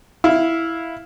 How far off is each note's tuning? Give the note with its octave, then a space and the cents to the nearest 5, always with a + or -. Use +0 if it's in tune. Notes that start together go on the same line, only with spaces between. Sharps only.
E4 +0 F5 +0